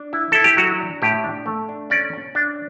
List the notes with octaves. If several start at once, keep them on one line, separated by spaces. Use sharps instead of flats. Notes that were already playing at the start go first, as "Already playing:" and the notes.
Already playing: D4
E4
E4 A4
G4
F#3 F#4
D4
A2 G4
D4
A3
D4
C#4 D5
C#4
D4